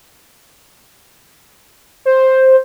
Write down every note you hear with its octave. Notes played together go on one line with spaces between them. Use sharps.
C5